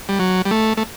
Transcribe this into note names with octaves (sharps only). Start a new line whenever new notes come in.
G3
F#3
G3
A3
A3